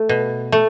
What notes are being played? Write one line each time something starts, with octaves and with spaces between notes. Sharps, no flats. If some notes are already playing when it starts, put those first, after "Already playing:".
Already playing: A3
B2
A3